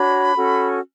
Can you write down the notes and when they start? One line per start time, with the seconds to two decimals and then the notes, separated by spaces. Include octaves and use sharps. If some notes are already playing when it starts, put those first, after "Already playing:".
Already playing: D4 F#4 C#5 B5
0.36 C#4 F#4 A4